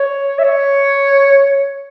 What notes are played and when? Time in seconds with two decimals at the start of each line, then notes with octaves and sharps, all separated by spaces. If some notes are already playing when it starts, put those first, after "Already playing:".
Already playing: C#5
0.39 E5
0.44 C#5